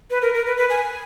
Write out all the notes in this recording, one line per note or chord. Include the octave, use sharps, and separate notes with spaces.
B4
A#4
A#4
B4
B4
G#5